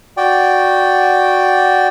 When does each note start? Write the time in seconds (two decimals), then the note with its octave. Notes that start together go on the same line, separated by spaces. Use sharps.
0.17 F#4 D5 G5